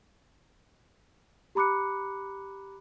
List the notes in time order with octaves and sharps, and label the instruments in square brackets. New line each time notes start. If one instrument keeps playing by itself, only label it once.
[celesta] G4 A#5 B5 D6 F#6 C#7